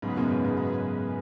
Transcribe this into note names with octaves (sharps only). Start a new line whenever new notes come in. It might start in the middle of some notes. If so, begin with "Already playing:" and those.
G#2 C#3 F#3 B3 G#4 B4
F#2 B2
G#2
G#2
G#2 F#3 B3 G#4 B4